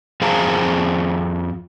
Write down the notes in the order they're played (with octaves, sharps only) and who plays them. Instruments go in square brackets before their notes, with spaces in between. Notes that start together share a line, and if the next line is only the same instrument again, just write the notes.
[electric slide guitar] F2 G#4 C5 F5 A5 A#5